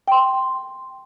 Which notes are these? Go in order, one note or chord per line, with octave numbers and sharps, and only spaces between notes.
G5 C6